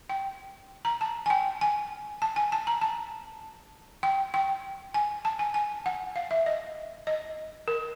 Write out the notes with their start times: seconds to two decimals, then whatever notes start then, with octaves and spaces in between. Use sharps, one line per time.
0.09 G5
0.85 A#5
1.01 A5
1.26 G#5
1.30 G5
1.61 G#5
2.22 A5
2.36 G#5
2.52 A5
2.67 A#5
2.81 A5
4.03 G5
4.34 G5
4.94 G#5
5.25 A5
5.39 G#5
5.54 G#5
5.86 F#5
6.16 F5
6.31 E5
6.46 D#5
7.07 D#5
7.68 A#4